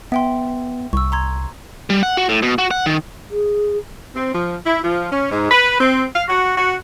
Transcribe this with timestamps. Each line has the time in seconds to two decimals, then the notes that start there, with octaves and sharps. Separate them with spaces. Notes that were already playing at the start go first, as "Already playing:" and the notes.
0.12 B3 E5 G5 C6
0.93 C2 C#6 E6
1.12 A#5 C6 G#6
1.90 G3
2.03 F#5
2.17 F#4
2.29 A2
2.42 B2
2.58 F#4
2.71 F#5
2.86 D#3
3.31 G#4
4.15 C4
4.33 F3
4.66 E4
4.83 F3
5.11 C#4
5.30 G#2
5.51 B4
5.79 C4
6.14 F5
6.28 F#4
6.57 F#4